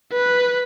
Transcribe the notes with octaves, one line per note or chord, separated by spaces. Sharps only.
B4